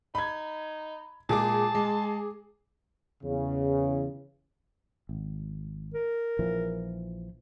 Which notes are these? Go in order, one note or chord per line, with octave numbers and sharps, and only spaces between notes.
D#4 B5 G#6
A#2 G#3 G#4 A5 D6
G#3
E2 C#3
G#1
A#4
A#1 E3 F3